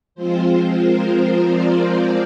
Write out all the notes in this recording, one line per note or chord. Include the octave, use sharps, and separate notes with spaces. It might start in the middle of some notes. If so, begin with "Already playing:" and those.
F3 G#3 C4 F4 C5
C5
A#4
C5
D5